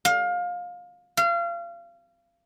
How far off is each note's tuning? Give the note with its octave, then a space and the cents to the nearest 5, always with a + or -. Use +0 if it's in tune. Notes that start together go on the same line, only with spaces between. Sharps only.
F5 +25
F5 -30